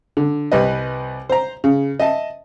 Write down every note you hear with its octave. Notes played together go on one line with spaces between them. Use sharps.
D3
C2 G3 B4 D#5
C5 A#5
C#3
D#5 E5 A5